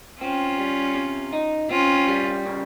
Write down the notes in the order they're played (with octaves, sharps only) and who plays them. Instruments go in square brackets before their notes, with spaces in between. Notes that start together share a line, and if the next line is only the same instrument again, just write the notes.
[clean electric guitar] C4 [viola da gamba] C#4 F4
[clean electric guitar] G3
C3
D#4
[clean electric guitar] C4 [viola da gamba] C#4 F4
[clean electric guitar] G3
C#3